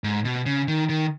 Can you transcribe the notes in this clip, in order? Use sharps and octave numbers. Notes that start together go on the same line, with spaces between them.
G#2
B2
C#3
D#3
D#3